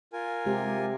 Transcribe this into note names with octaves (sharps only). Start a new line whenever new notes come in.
F4 A#4 G#5
C3 G#3 G4